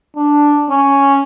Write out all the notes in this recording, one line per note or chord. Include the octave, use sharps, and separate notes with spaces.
D4
C#4